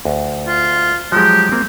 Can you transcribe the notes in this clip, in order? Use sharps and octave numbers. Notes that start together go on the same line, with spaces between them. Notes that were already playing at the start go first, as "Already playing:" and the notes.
D2
F4
F3 F#3 G#3 G4
A#3 C4